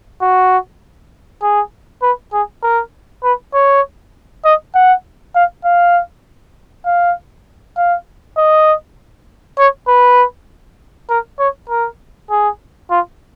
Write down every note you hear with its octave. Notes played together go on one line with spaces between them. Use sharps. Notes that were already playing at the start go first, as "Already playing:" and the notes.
F#4
G#4
B4
G#4
A#4
B4
C#5
D#5
F#5
F5
F5
F5
F5
D#5
C#5
B4
A#4
C#5
A#4
G#4
F4